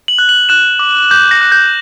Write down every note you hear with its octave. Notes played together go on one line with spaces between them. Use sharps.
F#7
F#6
F#7
F#6 E7
D6
D6 G6
A#6
F#6
G6